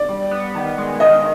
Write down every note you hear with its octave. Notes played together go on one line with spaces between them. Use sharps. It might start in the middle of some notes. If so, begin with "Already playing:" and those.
Already playing: D5
G3
B3
D#3
G#3
D#3 D#5